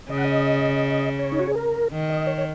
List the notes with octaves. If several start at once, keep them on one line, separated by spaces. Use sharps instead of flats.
C#3 D#5
F#5
D#5
C#5
D#4
F#4
G#4
A#4
D#3
D#5
C#5
C#5